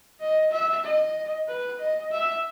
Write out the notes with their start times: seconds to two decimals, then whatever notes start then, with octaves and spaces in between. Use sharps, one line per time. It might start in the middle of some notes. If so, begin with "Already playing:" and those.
0.20 D#5
0.52 E5
0.84 D#5
1.48 B4
1.79 D#5
2.12 E5